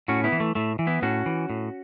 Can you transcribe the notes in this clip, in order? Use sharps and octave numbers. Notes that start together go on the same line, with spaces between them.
A2 C#4 F#4
B3 E4
E3
A3
A2 A3
E3
B3 E4
A2 C#4 F#4
E3
A2